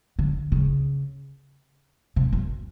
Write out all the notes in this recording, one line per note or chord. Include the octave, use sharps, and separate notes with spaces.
D3
C#3
C3
F#2